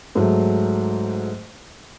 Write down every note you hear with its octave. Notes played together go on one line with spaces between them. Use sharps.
G#2 F#3 A3